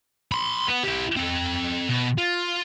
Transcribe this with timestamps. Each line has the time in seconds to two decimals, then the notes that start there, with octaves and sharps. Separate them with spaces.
0.32 B5 C6
0.68 B3
0.83 E4 G4
1.16 C4 A4
1.89 B2
2.18 F4